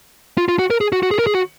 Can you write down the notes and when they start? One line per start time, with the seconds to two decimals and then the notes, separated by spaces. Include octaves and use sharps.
0.38 F4
0.48 F4
0.59 F#4
0.70 A#4
0.81 G#4
0.92 F#4
1.03 F#4
1.11 G#4
1.19 A#4
1.27 G#4
1.35 F#4